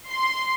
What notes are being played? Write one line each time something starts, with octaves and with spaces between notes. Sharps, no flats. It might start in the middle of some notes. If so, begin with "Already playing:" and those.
C6